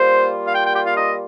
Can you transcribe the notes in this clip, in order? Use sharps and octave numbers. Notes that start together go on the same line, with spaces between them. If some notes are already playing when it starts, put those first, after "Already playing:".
Already playing: G3 A#3 F4 C5
F5
G5
G5
G5
F5
D#5